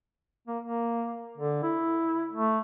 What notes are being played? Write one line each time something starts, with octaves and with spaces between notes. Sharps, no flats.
A#3
A#3
D3
E4
A3